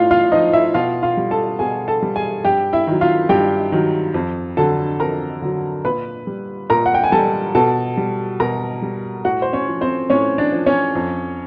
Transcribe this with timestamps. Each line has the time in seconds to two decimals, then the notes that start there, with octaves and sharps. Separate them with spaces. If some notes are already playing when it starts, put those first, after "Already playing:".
Already playing: A2 F3 F4 F5
0.11 F4 F5
0.32 F3 D#4 D#5
0.53 E4 E5
0.74 B2 F4 F5
1.03 F4 F5
1.17 G3
1.31 A4 A5
1.59 B2 G#4 G#5
1.88 A4 A5
2.02 G3
2.16 G#4 G#5
2.45 G2 G4 G5
2.73 E4 E5
2.87 D#3 F#3
3.01 F4 F5
3.29 G2 G4 G5
3.72 D#3 F#3
4.14 F2
4.57 D3 F#3 A4 A5
5.00 F2 A#4 A#5
5.42 D3 F#3
5.85 A#2 B4 B5
6.27 G3
6.70 A#2 A#4 A#5
6.86 F#5
6.94 G5
7.04 G#5
7.12 G3 A4 A5
7.55 B2 A4 A5
7.97 G3
8.40 B2 A#4 A#5
8.82 G3
9.25 A2 F#4 F#5
9.42 C5
9.53 C#4 C#5
9.67 F3
9.81 C4 C5
10.10 A2 C#4 C#5
10.38 D4 D5
10.52 F3
10.66 C#4 C#5
10.95 F2